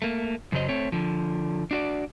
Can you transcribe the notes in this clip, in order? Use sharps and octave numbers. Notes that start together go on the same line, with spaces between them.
A3 A#3
F#2 C#3 F#3 C5 D#5
A3 C4 C#5
D3 F3
D4 F#4 D5